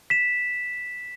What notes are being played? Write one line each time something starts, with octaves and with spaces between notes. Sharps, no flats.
B6 E7